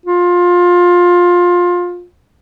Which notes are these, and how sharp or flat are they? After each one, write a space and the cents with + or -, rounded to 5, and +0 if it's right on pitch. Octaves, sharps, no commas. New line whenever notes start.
F4 +20